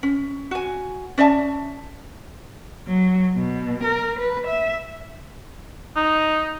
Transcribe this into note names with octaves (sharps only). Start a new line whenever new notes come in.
C#4
F#4 G#5
C#4 D5 E5 A5
F#3
B2
A#4
B4
E5
D#4